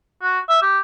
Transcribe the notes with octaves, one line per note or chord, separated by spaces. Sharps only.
F#4
E5
G4